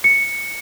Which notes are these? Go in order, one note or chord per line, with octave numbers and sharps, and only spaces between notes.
C#7